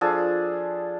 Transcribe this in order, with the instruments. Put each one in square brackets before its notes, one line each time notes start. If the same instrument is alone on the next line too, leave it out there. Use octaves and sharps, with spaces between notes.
[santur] F3 D4 G#4 A4